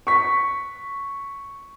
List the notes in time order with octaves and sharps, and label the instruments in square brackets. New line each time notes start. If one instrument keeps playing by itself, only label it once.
[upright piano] C#6 B6